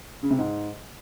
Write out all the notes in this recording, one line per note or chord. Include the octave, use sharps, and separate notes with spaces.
C#3
C3
G#2